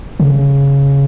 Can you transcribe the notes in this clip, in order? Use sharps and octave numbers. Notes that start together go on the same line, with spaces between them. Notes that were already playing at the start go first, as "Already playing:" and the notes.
C#3